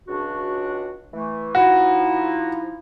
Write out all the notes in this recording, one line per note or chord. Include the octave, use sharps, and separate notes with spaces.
C#2 D4 F#4
E3 A3
F3 D#4 E4 F#4